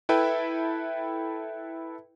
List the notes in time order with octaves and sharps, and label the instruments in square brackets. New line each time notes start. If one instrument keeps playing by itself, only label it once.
[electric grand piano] E4 A4 B4 E5 G5